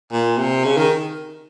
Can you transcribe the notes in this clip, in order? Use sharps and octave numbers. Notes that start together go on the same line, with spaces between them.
A#2
C3
C#3
D#3